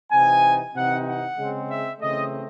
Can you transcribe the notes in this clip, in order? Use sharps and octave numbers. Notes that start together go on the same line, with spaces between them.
C3 E3 C4 D#4 G#5
C3 E3 C4 D#4 F#5
F#5
C#3 G#3 C4
E5
C#3 E3 A3 C4 D#5